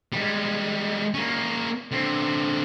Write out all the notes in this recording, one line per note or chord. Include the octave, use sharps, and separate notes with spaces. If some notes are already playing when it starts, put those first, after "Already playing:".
G3 G#3
A#3 C#4
D3 C4